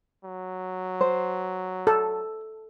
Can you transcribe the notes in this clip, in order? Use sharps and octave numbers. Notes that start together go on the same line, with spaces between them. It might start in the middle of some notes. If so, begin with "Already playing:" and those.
F#3
C5
A4